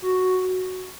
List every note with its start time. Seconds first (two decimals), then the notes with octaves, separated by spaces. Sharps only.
0.02 F#4